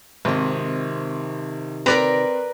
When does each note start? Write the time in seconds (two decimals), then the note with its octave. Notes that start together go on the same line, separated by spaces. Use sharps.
0.25 G#1 C3 D#3
1.86 C4 A#4 B4 D5 A#5